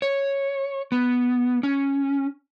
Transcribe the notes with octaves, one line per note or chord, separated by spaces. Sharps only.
C#5
B3
C#4